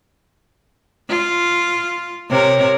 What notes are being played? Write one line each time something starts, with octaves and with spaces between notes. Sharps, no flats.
F4
C3 A#4 C#5